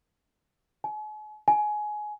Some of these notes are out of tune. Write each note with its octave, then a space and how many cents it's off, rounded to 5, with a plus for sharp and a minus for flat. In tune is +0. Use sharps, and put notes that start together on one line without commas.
G#5 +45
G#5 +20